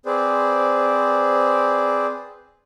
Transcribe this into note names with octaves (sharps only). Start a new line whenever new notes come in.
C4 G#4 B4 C5 D5